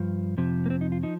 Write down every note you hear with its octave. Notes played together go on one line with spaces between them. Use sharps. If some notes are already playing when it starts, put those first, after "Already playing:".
Already playing: G2 F3
F2 C3 F3
A#3
C4
D#4
F4
F3 D#4